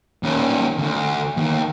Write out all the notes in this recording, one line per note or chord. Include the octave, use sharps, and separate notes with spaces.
D#2 C#4
D2
D#2